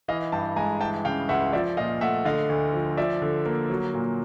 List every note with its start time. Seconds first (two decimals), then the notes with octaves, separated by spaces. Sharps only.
0.08 E3 D#5 F5
0.32 G2 G5 A5
0.56 G#3 G#5 A#5
0.81 E3 G5 A5
1.05 C#3 F5 G5
1.29 C#2 E5 F#5
1.53 F3 D5 E5
1.77 A#2 D#5 F5
2.01 A3 E5 F#5
2.25 D3 D#5 F5
2.49 D2
2.73 F3
2.97 F3 D5 E5
3.22 D3
3.46 A#3
3.70 F#3
3.94 A#2